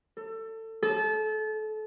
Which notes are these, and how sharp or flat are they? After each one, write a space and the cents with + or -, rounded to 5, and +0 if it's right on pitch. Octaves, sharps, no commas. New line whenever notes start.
A4 +25
A4 -30